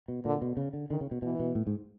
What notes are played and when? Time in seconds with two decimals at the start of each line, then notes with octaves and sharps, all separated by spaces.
0.08 B2
0.25 A#2 D3
0.42 B2
0.57 C#3
0.73 D3
0.90 D3 D#3
1.01 C#3
1.11 B2
1.22 B2 E3
1.40 B2
1.55 A2
1.67 G#2